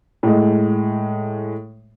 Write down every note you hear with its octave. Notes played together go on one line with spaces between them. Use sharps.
A2 G#3